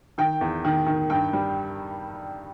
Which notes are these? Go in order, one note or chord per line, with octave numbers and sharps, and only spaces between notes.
D#3 G5
E2
D#3
D#3
G2 G5
G3